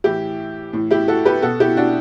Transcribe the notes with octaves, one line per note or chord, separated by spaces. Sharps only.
A2 E3 E4 G4
A2 E3
E4 G4
F#4 A4
G4 B4
B2 F#4 A4
E4 G4
D4 F#4